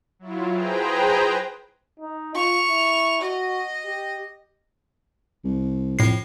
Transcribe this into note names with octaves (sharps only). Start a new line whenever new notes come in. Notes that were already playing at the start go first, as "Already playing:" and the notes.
F#3 E4 F4
G#4 B4 C5 G5 A#5
D#4
F4 C#6 F7
E4
F#4 D#5
G4
C2
F2 A2 C7